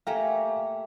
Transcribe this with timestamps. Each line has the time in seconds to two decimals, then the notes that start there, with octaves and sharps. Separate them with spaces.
0.07 A3 A#3 G4 F5 G#5 A#5